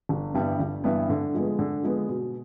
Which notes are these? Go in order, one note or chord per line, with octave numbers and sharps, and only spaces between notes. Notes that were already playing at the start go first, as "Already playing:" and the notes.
G1
G2 E3 G3 B3
G1
G2 E3 G3 B3
D3
F3 G#3 B3
D3
F3 G#3 B3
B2